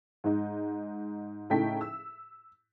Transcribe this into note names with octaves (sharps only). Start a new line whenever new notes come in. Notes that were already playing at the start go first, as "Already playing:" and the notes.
G#2 D#4
A2 C#3 D#4 A4 G5 B6
E6